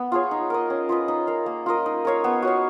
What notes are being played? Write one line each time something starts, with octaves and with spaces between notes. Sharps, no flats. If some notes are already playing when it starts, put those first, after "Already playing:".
Already playing: B3
F4 G#4 C#5
D#4
A#4 D#5
C#4
F4 B4 D#5
D#4
A#4 F5
A#3
F4 A#4 D#5
D#4
A#4 C#5 F5
B3
F#4 C#5 F5